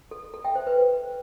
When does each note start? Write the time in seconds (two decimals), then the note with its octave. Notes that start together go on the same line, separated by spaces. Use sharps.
0.11 A4
0.34 A4
0.44 E5 G5
0.55 C5
0.67 B4